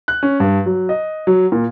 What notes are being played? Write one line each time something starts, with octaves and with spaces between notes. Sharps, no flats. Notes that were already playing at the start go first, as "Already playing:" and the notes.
F#6
C#4
G2
F#3
D#5
F#3
A#2